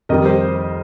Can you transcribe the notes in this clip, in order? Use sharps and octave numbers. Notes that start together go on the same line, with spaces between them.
F2 D#3 G3 A#4 D#5
G4 C5